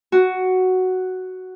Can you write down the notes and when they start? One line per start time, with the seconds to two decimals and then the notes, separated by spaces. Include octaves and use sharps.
0.12 F#4